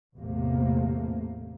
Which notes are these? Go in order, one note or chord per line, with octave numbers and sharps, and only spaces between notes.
A1 E2 C3 A3 A#3